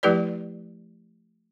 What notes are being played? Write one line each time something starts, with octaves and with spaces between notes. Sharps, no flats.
F3 A3 E4 G4 B4 D5